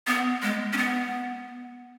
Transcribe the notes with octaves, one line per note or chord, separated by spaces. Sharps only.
B3
G#3
C#4
B3